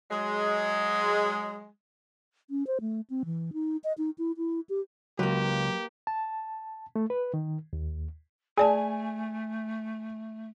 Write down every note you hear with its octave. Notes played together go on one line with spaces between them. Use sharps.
F#3 G#3
C#4
C5
A3
C4
E3
D#4
D#5
D#4
E4
E4
G4
C#2 F#3 A#3 G4 B4
A5
A3
B4
D#3
D#2
A3 G#4 D5 G#5 A5